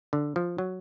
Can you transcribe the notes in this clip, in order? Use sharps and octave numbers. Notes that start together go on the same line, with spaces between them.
D3
F3
F#3